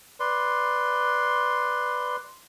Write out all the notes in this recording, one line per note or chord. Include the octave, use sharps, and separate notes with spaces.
B4 D5 C6